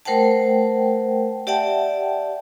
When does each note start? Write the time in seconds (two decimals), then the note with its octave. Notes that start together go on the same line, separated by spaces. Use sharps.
0.05 A3 A#4 C5 F#5 G5 A5
1.47 G4 D5 E5 F#5 G5 A5